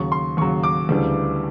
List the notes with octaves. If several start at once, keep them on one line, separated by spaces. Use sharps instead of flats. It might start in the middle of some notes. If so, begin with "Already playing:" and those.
Already playing: D#2 C#3 F#3 C#6
C6
D#2 C#3 F#3 C#6
D6
D2 C#3 E3 G3